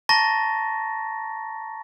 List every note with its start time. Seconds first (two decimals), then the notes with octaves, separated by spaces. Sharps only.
0.09 A5 A#5 C#6 A6 A#6